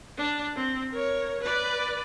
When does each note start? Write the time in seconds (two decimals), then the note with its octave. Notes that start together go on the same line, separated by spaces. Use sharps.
0.17 D4
0.56 C4
0.91 A#4 C#5
1.41 B4 D5